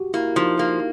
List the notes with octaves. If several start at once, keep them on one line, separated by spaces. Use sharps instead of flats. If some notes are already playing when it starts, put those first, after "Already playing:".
Already playing: F#4 G4
A#3 E4
F3 D#4
A#3